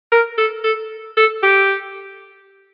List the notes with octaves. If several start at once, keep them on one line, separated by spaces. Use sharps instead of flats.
A#4
A4
A4
A4
G4